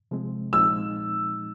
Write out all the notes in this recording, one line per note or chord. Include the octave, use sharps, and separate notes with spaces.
C3 F3 G#3 C4
A#2 F3 G#3 C4 D#4 E6